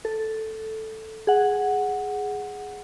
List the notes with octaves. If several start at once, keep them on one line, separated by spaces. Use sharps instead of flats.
A4
G#4 F#5